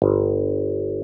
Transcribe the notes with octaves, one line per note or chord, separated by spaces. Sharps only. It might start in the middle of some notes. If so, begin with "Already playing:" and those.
G1